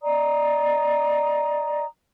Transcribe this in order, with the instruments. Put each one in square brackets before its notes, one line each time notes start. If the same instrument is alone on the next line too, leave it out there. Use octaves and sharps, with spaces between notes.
[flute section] D5 D#5 A#5 D#6